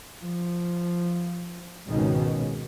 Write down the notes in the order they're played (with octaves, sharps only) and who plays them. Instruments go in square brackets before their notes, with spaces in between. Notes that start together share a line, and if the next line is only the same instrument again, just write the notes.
[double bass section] F3
G#1 C#2 B2 D#3 C#4